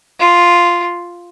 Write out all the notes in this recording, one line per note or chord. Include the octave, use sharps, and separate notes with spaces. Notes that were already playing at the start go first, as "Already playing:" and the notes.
F4